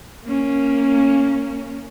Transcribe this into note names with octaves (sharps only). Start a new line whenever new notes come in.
A#3 C#4